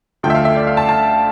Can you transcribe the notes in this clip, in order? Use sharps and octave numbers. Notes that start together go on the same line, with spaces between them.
D2 D3 F3 A3 G5
E5
F5
E5
D5
F5
A5
A5